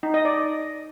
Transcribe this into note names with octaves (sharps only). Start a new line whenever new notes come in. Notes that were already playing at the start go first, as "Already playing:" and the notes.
D#4
D#5
D5